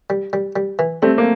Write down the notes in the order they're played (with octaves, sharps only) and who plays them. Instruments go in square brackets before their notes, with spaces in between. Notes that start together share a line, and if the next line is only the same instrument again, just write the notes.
[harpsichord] G3
G3
G3
E3
[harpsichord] G3 [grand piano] A3 C4
[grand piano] A#3